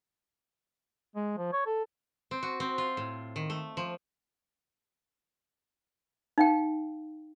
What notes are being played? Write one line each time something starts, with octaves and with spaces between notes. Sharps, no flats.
G#3
F3
C#5
A4
C4
F#4
C4
F4
A2
D#3
A3
F3
D#4 F5 G5